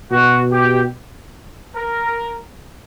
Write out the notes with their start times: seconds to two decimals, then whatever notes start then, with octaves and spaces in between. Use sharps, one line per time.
0.11 B2 F#4
0.52 G4
1.76 A#4